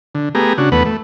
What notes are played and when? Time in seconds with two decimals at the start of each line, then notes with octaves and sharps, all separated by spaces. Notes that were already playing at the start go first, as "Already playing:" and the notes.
0.15 D3
0.35 A3 B3 G4 G#4 A#5
0.58 C#3 D4 F#4
0.72 E2 A3 B3 B4 F#5
0.86 A3